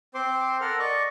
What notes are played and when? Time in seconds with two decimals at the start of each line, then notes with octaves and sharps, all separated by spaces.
0.14 C4 C5 C6 D6
0.61 A4 A#4 F#5 F6
0.79 D5 D#5 C#6 D6